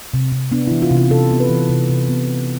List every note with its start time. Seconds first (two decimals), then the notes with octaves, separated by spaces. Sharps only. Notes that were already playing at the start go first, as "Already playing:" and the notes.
0.14 C3
0.32 C3
0.52 B3 D4
0.67 E4
0.71 E3
0.82 F4
0.91 C3
0.97 F4
1.10 C3 A4
1.31 B3
1.40 B4
1.50 E3
1.69 C3
1.89 C3
2.09 B3
2.28 E3